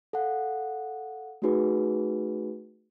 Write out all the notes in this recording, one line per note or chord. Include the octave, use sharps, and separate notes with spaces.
A4 F5 F#5
A3 C#4 D#4 F#4 G#4 B4